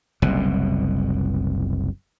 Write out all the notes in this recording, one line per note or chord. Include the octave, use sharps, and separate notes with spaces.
F#1 C2 B2